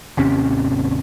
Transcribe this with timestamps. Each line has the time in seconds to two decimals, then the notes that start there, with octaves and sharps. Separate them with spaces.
0.17 G#1 D#2 C3 C#4